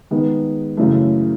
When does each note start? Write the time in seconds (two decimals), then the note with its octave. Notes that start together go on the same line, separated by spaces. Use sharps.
0.11 D#3 G#3 B3
0.77 F#2 C#3 E3 A3